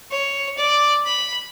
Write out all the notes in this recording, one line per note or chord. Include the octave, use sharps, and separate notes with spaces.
C#5
D5
B5